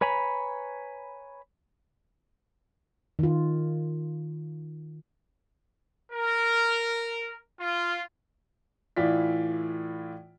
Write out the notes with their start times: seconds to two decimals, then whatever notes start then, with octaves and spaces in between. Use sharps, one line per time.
0.01 B4 C#5 G#5 A#5 B5
3.19 D#3 F4
6.12 A#4
7.59 F4
8.97 A2 E3 E4 F4 D5 B6